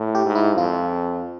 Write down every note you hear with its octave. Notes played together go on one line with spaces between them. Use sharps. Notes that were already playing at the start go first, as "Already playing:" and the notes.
Already playing: A2
G4
G#2
E4
F2 F4